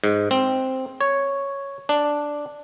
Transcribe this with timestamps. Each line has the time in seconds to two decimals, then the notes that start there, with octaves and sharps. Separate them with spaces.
0.04 G#2
0.31 C4
1.01 C#5
1.89 D4